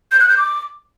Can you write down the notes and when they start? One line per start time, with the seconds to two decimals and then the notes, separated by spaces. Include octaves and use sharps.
0.12 G6
0.20 F#6
0.29 G6
0.38 D6